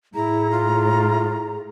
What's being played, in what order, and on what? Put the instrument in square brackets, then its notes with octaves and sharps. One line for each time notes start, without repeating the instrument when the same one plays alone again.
[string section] A2 [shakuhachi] E4 [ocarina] G#4 [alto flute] A#5
[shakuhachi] F4